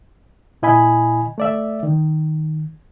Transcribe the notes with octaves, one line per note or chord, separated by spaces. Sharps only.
A#2 E4 D#5 G#5 B5
A3 D5 E5
D#3